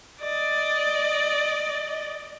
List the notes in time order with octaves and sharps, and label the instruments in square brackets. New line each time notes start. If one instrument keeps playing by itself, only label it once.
[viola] D5 D#5